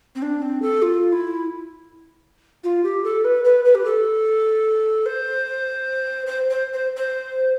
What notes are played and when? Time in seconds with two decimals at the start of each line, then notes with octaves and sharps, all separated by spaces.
0.15 C4
0.22 D4
0.42 C4
0.62 A4
0.82 F4
1.13 E4
2.64 F4
2.84 G4
3.04 A4
3.24 B4
3.44 B4
3.65 B4
3.75 G4
3.85 A4
5.06 C5
6.27 C5
6.50 C5
6.74 C5
6.97 C5